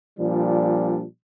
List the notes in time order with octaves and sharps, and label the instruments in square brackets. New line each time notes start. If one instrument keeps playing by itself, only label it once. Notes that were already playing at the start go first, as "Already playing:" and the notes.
[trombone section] A#2 F3 G3 D4